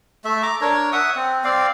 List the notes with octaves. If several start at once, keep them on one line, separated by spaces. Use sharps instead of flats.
A3 E5
A#5 D6
D4 A#4 C#5
E5 F#5 D#6
C4
C4 D5 F5